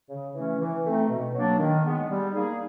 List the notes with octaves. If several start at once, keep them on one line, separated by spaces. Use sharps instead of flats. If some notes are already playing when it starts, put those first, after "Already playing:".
C#3
E3 A3 C#4
E3
A3 C4 D#4
B2
F#3 A#3 D4
D#3
G#3 B3
G3
A#3 D#4 G#4